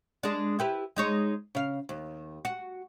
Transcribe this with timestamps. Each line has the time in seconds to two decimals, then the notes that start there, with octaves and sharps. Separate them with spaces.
0.23 G#3 D4
0.59 E4 G4 B4
0.96 G#3 D#4 C#5
1.55 C#3 F5
1.89 D#2
2.45 F#4